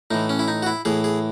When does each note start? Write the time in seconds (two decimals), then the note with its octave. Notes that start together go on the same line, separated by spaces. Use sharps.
0.11 A2 E3 D#4
0.29 C#4
0.39 E4
0.48 D#4
0.63 F#4
0.67 E4
0.85 A2 E3 G#4
1.04 G#4